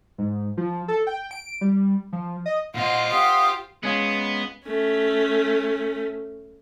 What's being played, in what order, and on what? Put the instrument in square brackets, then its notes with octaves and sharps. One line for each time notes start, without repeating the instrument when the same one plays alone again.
[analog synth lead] G#2
F3
A4
G5
D7
G3
F3
D#5
[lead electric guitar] A#2 D#5 [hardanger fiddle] F4 C5 [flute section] F#5
[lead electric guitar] G4 [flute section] F5 F#5 D#6
[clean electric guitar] G#3 C#4 F4 [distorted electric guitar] B3
[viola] A3 C#4